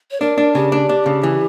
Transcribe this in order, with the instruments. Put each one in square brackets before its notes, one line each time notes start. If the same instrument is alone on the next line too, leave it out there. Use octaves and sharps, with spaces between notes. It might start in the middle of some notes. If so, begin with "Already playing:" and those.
[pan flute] C#5
[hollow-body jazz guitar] D4 [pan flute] A#4
[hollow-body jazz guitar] D4
[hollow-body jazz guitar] C#3 [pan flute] G4
[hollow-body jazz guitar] D4
D4
C#3
E3